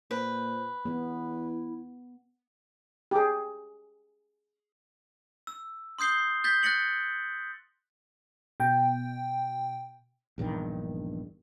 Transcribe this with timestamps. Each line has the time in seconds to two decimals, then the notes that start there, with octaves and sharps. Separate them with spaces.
0.11 A#2 B4 C5
0.85 E2 B3 E4
3.11 G4 G#4
5.47 E6
5.99 C6 D#6 G6 C7 G7
6.44 G6 A6 B6 G7
6.63 F#6 A6 A#6 C#7 F#7
8.60 B2 G5
10.38 A#1 E2 G2 D#3